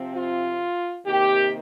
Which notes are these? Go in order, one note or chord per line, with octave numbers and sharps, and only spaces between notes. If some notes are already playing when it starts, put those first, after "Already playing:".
Already playing: C3 F3 C4
F4
C3 D#3 A#3 G4